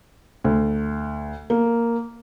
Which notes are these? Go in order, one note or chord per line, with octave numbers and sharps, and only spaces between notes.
D2
A#3